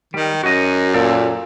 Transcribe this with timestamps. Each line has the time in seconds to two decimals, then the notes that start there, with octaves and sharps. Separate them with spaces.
0.14 D#3 G3
0.43 F#2 F#4 D#5
0.94 A#2 A#3 A4